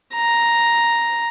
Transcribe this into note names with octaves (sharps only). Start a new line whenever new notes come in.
A#5